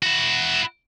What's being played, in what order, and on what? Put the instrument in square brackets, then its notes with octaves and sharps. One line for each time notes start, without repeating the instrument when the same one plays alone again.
[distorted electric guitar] E4 F#4